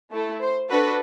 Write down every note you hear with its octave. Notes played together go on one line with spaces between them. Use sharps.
A3 E4 A4
C5
D4 F#4 A4 B4